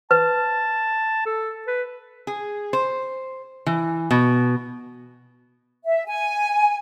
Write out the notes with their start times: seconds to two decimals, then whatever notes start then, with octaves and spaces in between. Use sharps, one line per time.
0.11 B4 A5
1.26 A4
1.67 B4
2.27 G#4
2.73 C5
3.66 E3
4.11 B2
5.85 E5
6.07 G#5